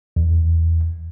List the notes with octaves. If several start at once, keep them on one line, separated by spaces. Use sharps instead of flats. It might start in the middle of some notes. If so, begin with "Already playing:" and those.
E2